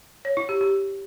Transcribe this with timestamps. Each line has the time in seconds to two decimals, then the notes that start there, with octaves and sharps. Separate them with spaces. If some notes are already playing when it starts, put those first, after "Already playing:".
0.25 C#5
0.37 E4
0.49 G4
0.61 G4